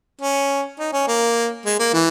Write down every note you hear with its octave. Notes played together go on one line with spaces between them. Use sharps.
C#4
D#4
C#4
A#3
G#3
A#3
E3